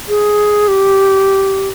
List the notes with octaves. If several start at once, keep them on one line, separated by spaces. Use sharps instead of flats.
G#4
G4